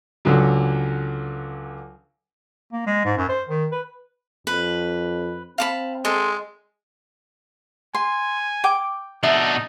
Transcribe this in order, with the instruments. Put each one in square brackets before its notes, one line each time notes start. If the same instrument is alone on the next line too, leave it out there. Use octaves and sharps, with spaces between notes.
[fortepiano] C#2 D3 F#3
[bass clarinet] A#3
G#3
G#2
F#2
C5
D#3
B4
[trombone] F2 [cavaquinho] B4
[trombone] C4 [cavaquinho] F5 A5 B5
[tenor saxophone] G#3 [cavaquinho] A4 C6
[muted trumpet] G#5 [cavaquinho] C6
[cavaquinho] G5 D6
[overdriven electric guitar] B2 D4 [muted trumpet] D#4 [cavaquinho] E5